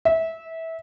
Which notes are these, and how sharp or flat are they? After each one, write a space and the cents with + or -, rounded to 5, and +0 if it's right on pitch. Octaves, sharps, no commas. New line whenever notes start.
E5 -20